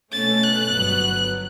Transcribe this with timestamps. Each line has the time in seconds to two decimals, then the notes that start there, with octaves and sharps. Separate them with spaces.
0.12 B2 A3 C#4 A6
0.43 F#6
0.72 G1 G2 F#3 B3